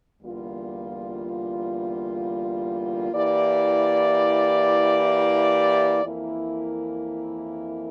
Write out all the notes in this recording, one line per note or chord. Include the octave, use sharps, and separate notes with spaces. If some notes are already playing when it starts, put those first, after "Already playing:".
E2 D3 G3 A#3 F4
E3 A#3 E4 G4 D5
F2 E3 A#3 E4 A#4